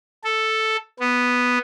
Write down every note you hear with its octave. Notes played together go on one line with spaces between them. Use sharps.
A4
B3